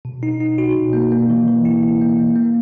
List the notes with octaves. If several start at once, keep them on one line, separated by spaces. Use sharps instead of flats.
B2
D#4
D#4
F#4
B2
A#3
A#3
E3
E3
E4
E4
A#3
A#3
A#3